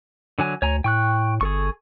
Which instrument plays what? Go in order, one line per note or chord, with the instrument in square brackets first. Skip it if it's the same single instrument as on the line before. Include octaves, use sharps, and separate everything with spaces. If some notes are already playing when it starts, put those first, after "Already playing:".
[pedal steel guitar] D3 F#3 G#5
[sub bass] D2 [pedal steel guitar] C#5 G#5 A#5
[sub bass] A2 [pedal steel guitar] G5 C#6 F#6
[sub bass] G1 [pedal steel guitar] G#4 A4 C#6